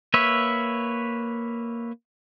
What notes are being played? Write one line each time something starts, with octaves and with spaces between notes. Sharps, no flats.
A#3 B4 C#5 E5